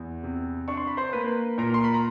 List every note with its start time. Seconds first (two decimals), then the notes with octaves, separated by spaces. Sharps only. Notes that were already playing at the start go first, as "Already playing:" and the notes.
Already playing: E2
0.24 C3
0.68 D4 C#6
0.77 C6
0.87 B5
0.97 C5 C6
1.13 A#3 B4 B5
1.58 A#2 A#4 A#5
1.74 C6
1.84 B5
1.94 A#5